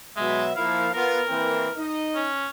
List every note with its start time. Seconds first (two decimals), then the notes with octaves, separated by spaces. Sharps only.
0.17 B2 F#3 G#3 E5
0.56 F3 A#3 E4 F5
0.94 B3 F4 A#4
1.28 E3 A#3 C4
1.77 D#4 D#5
2.15 C#4